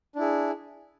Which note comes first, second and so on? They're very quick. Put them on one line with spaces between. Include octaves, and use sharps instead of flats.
D4 E4 G#4